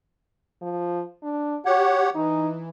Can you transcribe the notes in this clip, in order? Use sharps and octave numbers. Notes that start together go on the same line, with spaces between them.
F3
D4
F#4 G4 C#5 F#5
E3 D#4